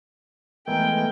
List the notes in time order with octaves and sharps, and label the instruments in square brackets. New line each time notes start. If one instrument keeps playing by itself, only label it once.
[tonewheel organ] E3 G#3 [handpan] A3 B3 A#4 [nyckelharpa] G5